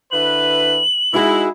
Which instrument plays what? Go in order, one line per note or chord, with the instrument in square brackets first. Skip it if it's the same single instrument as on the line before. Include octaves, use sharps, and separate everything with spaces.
[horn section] D3 E4 B4 [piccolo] F#7
[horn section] G#3 E4 [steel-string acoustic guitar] D#4 F#4 G#4